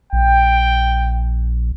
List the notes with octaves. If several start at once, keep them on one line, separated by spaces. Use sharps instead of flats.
A#1 G5